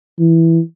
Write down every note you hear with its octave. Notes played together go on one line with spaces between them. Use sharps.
E3